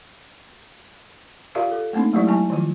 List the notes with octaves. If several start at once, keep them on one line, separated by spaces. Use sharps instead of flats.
F4 G4 A#4 D5 E5 F5
A4
A3 A#3 C4 D4 D#4
F#3 G#3 A3 E4 G4 D5
F#3 E4 G#5 A5
D#3 F3 F4